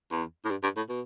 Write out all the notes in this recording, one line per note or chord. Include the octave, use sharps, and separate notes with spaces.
E2
A2
G2
G2
A2
B2